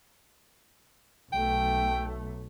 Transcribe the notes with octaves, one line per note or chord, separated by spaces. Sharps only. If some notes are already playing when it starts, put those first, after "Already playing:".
B1 A3 G5